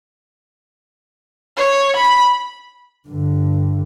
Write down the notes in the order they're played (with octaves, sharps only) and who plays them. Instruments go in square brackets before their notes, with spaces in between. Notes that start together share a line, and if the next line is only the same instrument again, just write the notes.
[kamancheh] C#5
B5
[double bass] G2 D3